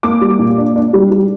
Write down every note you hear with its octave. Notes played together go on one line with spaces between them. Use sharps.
A#3 D6
G3
A#2
D4
D4
G3
G3